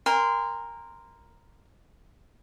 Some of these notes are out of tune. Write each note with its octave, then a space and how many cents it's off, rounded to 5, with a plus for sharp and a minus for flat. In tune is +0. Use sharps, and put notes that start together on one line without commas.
A#4 +0 G#5 -45 C6 -20